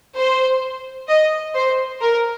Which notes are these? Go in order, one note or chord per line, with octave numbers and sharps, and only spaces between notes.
C5
D#5
C5
A#4